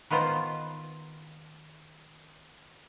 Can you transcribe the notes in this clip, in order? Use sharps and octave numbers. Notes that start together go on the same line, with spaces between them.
D#3 B3 D#4 F4 C5